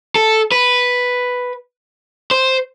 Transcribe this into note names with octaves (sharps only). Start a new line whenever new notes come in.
A4
B4
C5